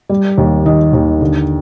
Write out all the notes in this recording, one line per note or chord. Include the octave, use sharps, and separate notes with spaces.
G3
D#2
D#3 D#5
D#2
D3